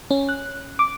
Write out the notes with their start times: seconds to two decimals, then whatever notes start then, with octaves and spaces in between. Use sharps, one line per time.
0.11 C#4
0.29 F#6
0.79 D6